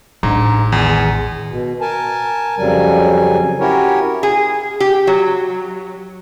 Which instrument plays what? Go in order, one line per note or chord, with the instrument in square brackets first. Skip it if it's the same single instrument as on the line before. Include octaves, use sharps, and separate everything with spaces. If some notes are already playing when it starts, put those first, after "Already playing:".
[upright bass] A1 [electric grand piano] G#2 [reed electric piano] D4 A#5
[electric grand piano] E2 [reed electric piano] D#3 G#4
[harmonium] B2
A#4 G#5 A5
F2 C#3 F#3 G3 G#5
C#4 E4 F#4 G4 A#4 C#5
[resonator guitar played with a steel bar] G#4
G4
F#3